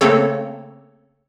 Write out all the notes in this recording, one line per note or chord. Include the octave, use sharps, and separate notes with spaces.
C#3 A3 A#3 C4 A4 C#5